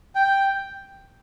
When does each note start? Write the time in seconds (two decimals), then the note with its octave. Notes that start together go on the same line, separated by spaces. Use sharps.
0.16 G5